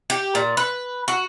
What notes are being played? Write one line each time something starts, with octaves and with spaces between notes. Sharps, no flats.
G4
A#2
B4
F#4